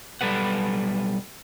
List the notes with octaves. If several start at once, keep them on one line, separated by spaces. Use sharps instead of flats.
B1 B2 G3 A4 B4 F#5